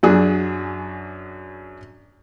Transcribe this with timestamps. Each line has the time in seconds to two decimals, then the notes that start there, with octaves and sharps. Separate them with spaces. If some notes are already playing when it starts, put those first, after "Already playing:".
0.03 F#2 F#3 D4 G#4